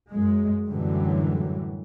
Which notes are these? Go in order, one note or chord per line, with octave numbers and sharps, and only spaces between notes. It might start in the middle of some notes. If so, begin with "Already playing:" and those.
F#2 G#3
F#2 A2 D3 E3 F#3 G3